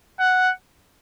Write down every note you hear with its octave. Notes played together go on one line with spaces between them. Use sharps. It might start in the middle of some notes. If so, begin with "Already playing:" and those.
F#5